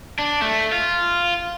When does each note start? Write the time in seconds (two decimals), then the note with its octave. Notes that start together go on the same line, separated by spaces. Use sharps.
0.19 D4
0.42 A3
0.72 F4